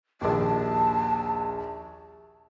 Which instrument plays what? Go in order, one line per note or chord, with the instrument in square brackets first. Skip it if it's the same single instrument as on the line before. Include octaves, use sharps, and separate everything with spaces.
[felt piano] A#1 D#2 [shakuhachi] A5